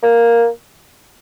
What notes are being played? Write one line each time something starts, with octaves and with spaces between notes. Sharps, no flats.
A#3